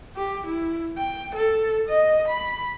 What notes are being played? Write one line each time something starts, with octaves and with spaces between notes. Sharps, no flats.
G4
E4
G5
A4
D#5
B5